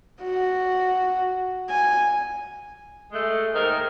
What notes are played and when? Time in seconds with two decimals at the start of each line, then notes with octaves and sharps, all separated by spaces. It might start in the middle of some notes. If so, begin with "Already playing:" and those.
0.22 F#4
1.69 G#5
3.13 G#3 A3
3.55 D#2 G#2 D#3 A#4